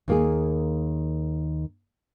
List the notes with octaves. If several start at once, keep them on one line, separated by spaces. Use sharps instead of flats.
D#2 A#3 G#4